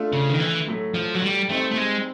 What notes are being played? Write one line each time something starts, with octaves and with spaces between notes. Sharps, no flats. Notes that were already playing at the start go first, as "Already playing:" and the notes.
Already playing: A3 D4 F4
C#3
D#3
E3
A2 F#3 A3
F3
F#3
G3
G3 A3 C4 D#4
A3
G#3